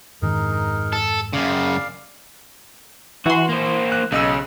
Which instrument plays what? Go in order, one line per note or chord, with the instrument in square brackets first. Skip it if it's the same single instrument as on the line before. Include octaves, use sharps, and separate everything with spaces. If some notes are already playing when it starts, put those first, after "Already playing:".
[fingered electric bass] F2 G#2 D#3 [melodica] D#4 G#4 A#4
[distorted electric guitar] A4
[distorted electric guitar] F#2 C#3 [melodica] D5 F5
[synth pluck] E3 C6 [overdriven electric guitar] F#4
[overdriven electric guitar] A#3 C5
[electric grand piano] F#6
[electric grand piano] B1 D#5 E6 [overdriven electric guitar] C#3